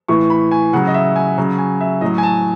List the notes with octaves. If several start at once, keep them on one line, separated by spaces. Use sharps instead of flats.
A2 E3 C#6
B5
G#5
C#3 F#3 F#5
D#5
E5
G#5
C#3 F#3
G#5
E5
A2 F#3 D#5
G#5
A5